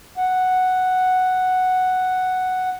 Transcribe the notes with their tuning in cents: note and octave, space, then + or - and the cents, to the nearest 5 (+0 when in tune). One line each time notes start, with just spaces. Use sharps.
F#5 +0